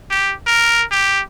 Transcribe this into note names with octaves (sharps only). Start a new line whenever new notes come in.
G4
A#4
G4